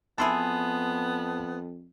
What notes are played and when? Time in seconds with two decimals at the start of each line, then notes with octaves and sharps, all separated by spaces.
0.18 F2 E3 B3 E4 G#4 A5 C6 D#6